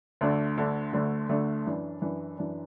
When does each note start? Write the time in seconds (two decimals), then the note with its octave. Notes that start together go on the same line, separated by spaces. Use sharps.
0.21 D2 D3 A3 D4
0.57 D2 D3 A3 D4
0.93 D2 D3 A3 D4
1.29 D2 D3 A3 D4
1.66 F#2 E3 D4
2.02 F#2 E3 D4
2.38 F#2 E3 D4